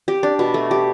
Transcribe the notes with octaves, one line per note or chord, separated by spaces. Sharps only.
G4
D4
B2
A3
G4